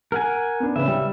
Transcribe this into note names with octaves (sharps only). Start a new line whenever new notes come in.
A#4 F#5 G#5
B3 D4
C#3 B4 E5
G3